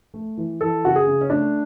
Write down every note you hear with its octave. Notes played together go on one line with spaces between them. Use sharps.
A3
E3
E3 A4
C#3 F#4
G#4
C#3
C#4
A3 D4